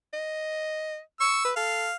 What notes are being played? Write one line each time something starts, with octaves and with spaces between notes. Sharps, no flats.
D#5
C#6 E6
B4
A4 F5